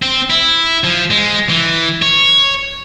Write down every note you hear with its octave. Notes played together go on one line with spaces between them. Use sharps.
C4
E4
F3
G#3
E3
C#5